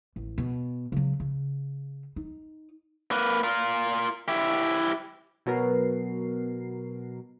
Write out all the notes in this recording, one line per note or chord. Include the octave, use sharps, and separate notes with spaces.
A1
B2
C#3 F#3
C#3
D#4
A#3 B4
F4 A#4
E4 G4
B2 F#3 B3 A#4 C7